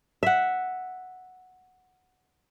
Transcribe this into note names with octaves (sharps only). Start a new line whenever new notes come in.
E5 F#5